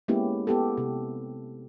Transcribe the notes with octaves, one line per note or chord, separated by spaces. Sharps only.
G#3 A#3 B3 C#4 E4 G4
B3 G4 A4
C3